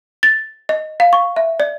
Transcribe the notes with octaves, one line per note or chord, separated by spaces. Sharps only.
A6
D#5
F5
C#6
E5
D5